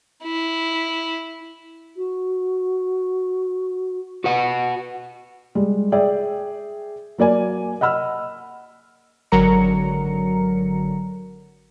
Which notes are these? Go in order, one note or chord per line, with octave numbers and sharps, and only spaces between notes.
E4
F#4
F#4 B4 F#5
G3 G#3
G#4 D5 E5 G5
F#3 A#3 D5 G#5
D#5 F#5 B5 E6 F6
G#1 D3 F#3 A#4 A#5 C#7